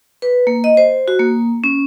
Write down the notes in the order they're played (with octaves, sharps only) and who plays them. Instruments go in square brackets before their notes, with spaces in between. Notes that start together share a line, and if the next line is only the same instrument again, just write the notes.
[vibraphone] B4
A#3
D#5
C5
F#4
A#3
C#4